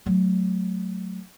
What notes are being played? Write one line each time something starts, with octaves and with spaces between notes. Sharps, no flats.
F#3 A3